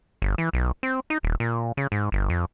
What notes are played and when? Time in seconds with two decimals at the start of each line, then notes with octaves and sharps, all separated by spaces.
0.22 G1
0.38 E3
0.53 B1
0.83 C4
1.10 D#4
1.23 D#1
1.40 A#2
1.77 C#3
1.92 G#2
2.12 G1
2.30 F2